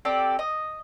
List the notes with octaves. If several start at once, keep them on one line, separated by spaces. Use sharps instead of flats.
C4 G4 A4 D5
D#5